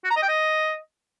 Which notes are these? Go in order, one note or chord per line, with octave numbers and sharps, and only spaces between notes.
F#4
A#5
D#5
G5
D#5